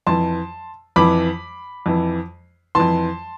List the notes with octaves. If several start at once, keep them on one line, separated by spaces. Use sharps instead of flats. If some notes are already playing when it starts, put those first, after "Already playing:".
F2 E3 A5 C6
F2 E3 B5 D6
F2 E3
F2 E3 A5 C6